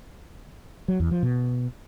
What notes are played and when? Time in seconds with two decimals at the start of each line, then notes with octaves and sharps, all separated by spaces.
0.88 F#3
1.00 E2
1.11 F3
1.23 B2